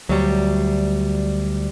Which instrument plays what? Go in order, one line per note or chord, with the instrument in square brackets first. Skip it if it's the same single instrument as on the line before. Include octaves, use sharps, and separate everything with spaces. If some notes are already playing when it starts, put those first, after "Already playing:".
[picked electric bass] D2 [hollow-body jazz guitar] F#3 G3